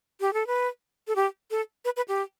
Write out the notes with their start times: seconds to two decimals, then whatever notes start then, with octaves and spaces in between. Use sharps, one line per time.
0.21 G4
0.33 A4
0.47 B4
1.08 A4
1.16 G4
1.51 A4
1.85 B4
1.97 B4
2.08 G4